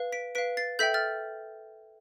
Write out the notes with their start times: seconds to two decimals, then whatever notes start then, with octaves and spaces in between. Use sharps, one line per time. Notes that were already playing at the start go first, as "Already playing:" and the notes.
Already playing: B4 F5
0.12 B6 D7
0.35 B4 F5 B6 D7
0.57 A6 C7
0.79 A4 E5 G5 G6 B6
0.94 F6 A6